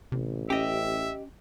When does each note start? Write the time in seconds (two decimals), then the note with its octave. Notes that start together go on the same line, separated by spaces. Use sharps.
0.12 A1 C3
0.50 C#4 G4 D#5 E5